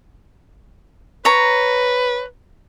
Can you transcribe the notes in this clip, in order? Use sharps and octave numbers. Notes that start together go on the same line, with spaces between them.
B4 C#5 A#5